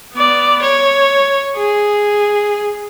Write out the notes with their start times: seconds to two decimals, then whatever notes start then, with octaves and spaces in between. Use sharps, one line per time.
0.14 B3 D5
0.62 C#5
1.56 G#4